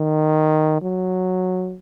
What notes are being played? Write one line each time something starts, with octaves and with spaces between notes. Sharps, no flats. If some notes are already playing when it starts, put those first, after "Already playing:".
Already playing: D#3
F#3